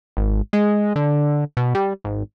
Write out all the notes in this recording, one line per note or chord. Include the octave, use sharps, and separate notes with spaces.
G#1
G#3
D3
B2
G3
G#1